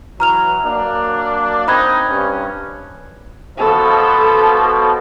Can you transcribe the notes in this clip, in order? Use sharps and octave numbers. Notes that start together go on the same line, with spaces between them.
E3 F#3 A#5 F6 F7
F#3 A#3 D4
C4 D#4 B5 F#6 G#6
G2 C#4
B2 F3 A4